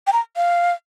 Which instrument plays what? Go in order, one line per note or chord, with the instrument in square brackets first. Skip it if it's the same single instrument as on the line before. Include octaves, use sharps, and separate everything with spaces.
[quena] G5
A#5
F5